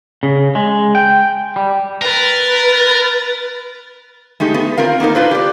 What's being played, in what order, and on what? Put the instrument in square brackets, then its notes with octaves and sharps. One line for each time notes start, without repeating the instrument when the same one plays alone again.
[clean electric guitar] C#3
G#3
G5
G3
[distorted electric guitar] A#4 [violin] B4 A6
[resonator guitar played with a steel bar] G#3 A3 D#4 G4
A3 B3
C4 F4 A#4 F5
A#3 B3 D#4 A#4
D4 F4 B4 C5
G4 D5